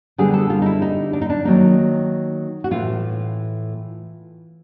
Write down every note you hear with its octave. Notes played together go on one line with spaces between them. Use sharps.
D3 G3 B3 G#4
A4
F4
D#4
E4
D#4
D4
D#4
D4
D#3 F#3 A#3 D#4
F#4
A2 E3 A3 F4